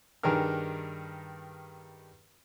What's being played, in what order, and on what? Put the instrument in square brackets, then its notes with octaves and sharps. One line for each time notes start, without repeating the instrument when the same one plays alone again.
[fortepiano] G2 D#3 D4 G#4 A#4 F6